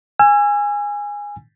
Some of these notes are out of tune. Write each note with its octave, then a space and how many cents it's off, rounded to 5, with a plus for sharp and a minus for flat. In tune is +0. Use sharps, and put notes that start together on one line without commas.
G#5 -15 E6 +35